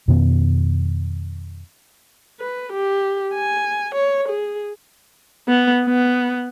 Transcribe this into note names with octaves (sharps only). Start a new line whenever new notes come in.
F2 B2 D#3 B3
B4
G4
G#5
C#5
G#4
B3
B3